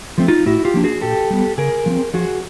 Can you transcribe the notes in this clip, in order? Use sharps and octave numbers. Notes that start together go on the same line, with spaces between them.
F3 A3 C4
D#4 F4
A2 E4 F#4
F4 G4
F3 A#3 D4
F#4 G#4
A#2 G4 A4
G3 B3
C#3 G#4 A#4
F3 A3 C4
F3 F#4 G#4